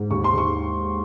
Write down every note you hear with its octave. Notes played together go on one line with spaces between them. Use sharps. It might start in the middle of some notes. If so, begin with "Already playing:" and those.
Already playing: G#2
D#2 C#6
C6
D#2 C#6